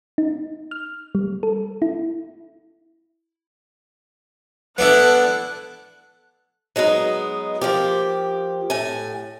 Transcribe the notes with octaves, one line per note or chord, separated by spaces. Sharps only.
D#4
F6
G3
A4
E4
B3 D4 E4 A4 F#6
F#3 G#3 B3 D#4
F3 A#3 G4
A2 G#5